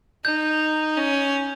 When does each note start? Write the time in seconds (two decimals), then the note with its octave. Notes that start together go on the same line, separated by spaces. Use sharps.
0.25 D#4 G6
0.97 C#4